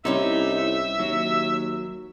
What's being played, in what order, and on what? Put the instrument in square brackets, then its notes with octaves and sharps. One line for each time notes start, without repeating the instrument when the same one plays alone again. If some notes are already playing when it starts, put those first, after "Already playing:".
[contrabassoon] C2 [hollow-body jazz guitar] C3 C#4 E4 [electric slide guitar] D#4 [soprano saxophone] E5
[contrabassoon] D#2 [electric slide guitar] F#3